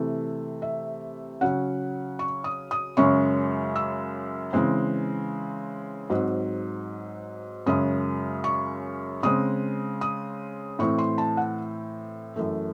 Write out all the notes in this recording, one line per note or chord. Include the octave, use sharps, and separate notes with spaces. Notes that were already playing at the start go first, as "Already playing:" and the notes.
Already playing: C3 E3 A3
E5
C#3 F#3 C#4 F#5
C#6
D#6
D#6
F#2 C#3 G#3 C#4 C#6
E6
C#3 E3 G#3 C4
G#2 F#3 C4
F#2 C#3 G#3 C#4 D#6
C#6
C#3 G#3 C4 D#6
D#6
A2 E3 C4 C#6
C6
A5
F#5
F#2 E3 A3